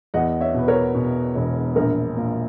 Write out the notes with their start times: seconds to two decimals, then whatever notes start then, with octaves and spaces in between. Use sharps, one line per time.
0.14 E2 D#5 F#5
0.40 C#5 E5
0.54 B2 B4
0.68 A#4 C#5
0.95 B2
1.35 E1
1.76 A#1 A#4
2.16 A#2